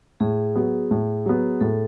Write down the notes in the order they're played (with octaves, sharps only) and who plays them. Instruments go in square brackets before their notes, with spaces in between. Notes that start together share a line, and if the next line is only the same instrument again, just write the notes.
[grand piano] A2 [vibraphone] G#4
[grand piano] F#3 B3
A2
F#3 B3
[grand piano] A2 [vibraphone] A4